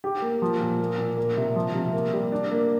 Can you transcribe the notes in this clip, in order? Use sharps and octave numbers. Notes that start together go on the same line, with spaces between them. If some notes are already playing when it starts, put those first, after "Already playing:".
G4
A#3
F3
A#2
A#3
A#2
A#3
C3
F3
C3
A#3
G3
D4
A#3